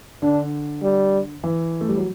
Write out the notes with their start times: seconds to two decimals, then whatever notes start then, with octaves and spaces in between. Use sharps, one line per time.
0.22 D3 D4
0.83 G3
1.44 E3
1.81 A3
1.89 G3
1.97 F#3